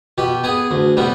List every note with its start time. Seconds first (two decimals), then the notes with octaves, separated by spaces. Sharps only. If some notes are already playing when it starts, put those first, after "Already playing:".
0.18 B2 G4
0.44 B3 G#4
0.71 D2
0.97 C3 G3 B3